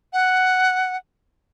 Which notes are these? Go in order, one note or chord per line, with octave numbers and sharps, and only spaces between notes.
F#5